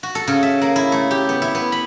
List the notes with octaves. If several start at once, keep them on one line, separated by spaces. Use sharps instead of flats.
F#4
A4
C#3
E5
A#3
E4
A3
G4
B3
E4
B3
B5